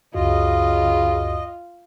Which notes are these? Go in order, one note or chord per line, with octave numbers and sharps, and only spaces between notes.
C#2 F#2 C#3 F4 F#4 D#5